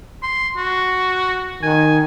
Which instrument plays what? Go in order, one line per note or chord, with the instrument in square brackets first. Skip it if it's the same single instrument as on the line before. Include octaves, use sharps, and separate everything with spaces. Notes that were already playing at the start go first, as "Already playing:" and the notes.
[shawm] C6
F#4
[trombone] D#3 [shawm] G#5